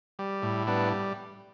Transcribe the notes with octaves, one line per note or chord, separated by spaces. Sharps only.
G3
A2
G3 B3 D4